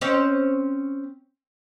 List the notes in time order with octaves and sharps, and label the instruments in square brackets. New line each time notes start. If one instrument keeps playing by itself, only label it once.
[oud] C4 C#4 C#5